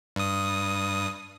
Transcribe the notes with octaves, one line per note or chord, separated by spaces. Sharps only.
G2 D#6